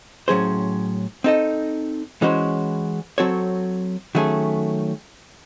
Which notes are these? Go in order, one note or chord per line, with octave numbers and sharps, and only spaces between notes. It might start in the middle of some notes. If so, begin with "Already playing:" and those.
A2 F#3 C#4 G#4 C5
C4 D#4 A4 D#5
E3 G#3 C#4 F#4 C5
F#3 C4 F#4 A4 C#5
D#3 F#3 A3 C#4 G#4